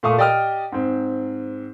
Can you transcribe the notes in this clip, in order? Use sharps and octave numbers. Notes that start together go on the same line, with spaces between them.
A#2 A3 F5 C#6 D#6
G4 D5 D#5 G5 D#6 F6
G#2 C4